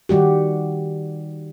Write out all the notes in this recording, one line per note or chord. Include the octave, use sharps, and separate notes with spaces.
D#3 G3 F#4 G4